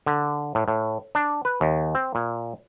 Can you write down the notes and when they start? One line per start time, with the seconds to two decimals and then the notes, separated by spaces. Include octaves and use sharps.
0.06 D3
0.55 A2
0.68 A2
1.15 D4
1.45 B4
1.61 D#2
1.95 C4
2.15 A#2